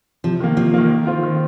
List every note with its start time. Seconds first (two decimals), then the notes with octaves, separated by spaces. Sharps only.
0.24 C3 F3
0.40 D#3 A#3
0.57 C3 F3
0.74 D#3 A#3
0.91 D#3
1.07 C4 F4
1.23 D#3